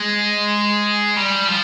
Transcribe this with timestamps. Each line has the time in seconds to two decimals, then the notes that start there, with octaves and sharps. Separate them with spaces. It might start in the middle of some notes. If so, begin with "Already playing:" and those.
Already playing: G#3
1.16 G3
1.48 F3